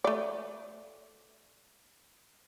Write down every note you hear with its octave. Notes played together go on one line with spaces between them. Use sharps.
A3 D5